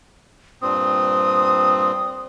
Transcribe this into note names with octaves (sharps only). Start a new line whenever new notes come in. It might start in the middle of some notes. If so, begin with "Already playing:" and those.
G2 A#2 C4 D#6